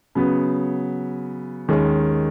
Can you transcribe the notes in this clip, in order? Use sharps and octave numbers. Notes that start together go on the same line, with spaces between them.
C#3 F#3 B3
D#2 D#3 G#3 C#4